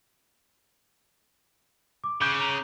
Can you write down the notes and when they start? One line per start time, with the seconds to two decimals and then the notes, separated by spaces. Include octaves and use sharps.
2.04 D6
2.21 C#3 D6 F#6 G6
2.40 A#5 F7